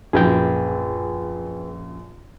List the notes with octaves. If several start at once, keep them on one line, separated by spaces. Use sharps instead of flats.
A#1 F#2 G#4 B4 G5